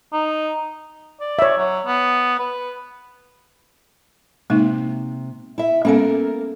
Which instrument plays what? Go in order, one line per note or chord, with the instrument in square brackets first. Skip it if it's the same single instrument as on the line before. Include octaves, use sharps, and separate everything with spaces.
[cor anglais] D#4
D5
[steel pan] C#5 E5
[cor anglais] F#3
B3
B4
[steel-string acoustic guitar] C3 [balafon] G#3 A#3 D#4
[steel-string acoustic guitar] E4 E5
[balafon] G#3 B3 C#4 [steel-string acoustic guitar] A#3 A4 A#4